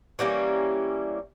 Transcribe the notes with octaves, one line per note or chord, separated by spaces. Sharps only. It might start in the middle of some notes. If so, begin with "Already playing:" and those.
E3 G3 A#3 C#4